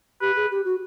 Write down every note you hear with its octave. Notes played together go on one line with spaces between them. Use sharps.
G4 B4
G#4
G4
F#4